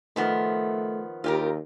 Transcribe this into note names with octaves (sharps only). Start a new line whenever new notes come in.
D#3 F3 A3 B3
D#2 F4 G4 A#4